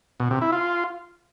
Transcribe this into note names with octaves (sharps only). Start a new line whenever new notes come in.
B2
C3
E4
F4